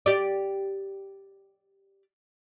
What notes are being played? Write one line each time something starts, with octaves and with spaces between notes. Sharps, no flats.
G4 D5